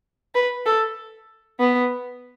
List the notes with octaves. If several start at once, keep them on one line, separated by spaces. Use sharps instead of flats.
B4
A4
B3